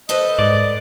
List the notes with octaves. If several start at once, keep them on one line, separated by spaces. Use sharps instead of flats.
A4 B4 C5 D#5
G#2 D5